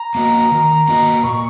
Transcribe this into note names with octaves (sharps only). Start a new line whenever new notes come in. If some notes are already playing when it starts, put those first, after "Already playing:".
Already playing: A#5
A#3 F#4 D#5
D#3
A#3 F#4 D#5
A#2 C#6